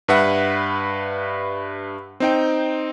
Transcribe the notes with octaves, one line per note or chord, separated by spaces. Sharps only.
G2 B4 E5 F#5
C4 D#4 G5